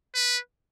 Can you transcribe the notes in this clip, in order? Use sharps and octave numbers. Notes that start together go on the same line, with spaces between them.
B4